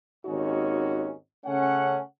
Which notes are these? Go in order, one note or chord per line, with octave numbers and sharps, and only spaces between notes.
G#1 D#2 C#4 D#4 F#4
C#3 A3 C#4 F#5